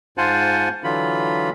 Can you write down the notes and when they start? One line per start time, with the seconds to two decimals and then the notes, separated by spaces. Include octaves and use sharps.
0.18 G#2 F4 C5 F#5 G#5 A5
0.84 D3 E3 F#3 F4 B5